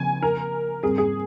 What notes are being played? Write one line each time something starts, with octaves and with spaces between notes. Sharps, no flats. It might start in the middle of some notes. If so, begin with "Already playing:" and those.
Already playing: C#3 F3 C4 G#5
A#4
G#2 G3 C4 G#4
G#4